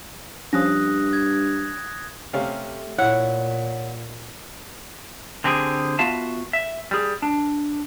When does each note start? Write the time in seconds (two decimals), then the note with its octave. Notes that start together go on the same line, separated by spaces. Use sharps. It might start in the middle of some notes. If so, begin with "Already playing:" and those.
0.53 G2 F3 C#4 D#6 F#6 A#6
1.13 G#6
2.33 C3 A3 C#4 F5
2.98 A#2 E4 C#5 F#5
5.44 D3 C4 G4 G#4
5.99 B3 F4 F#4 E5 F5 A5
6.53 E5
6.91 G3 G#4
7.22 D4